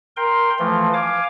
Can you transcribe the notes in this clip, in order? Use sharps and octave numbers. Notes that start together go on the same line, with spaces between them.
A#4 G5 C6
E3 F3 A3
F5 G#5 D6